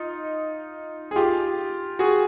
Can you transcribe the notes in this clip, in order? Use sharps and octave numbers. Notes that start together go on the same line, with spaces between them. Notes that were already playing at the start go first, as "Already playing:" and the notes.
Already playing: D#4 F4
G#4
F4 G4
F#4 G#4